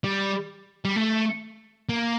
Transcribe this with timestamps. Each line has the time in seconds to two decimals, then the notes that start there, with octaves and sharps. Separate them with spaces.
0.04 G3
0.85 G3
0.96 A3
1.89 A#3